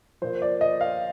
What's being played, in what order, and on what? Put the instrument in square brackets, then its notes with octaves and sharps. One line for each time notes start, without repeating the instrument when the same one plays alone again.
[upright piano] A#2 F3 C5
D5
D#5
F5